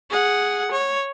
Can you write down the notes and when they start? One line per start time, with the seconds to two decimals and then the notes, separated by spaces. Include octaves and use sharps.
0.10 G#4 F#5
0.71 C#5